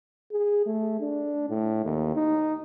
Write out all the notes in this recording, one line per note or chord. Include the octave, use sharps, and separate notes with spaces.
G#4
A3
D4
A2
D#2
D#4